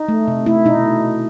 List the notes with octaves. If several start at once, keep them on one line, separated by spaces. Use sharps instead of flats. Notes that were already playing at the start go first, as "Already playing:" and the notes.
Already playing: D#4
A3
C3
A3 E4
B2 D#4